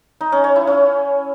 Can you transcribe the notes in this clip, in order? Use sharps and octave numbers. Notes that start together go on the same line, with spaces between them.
D#4
C#4
C#5
E4
C#4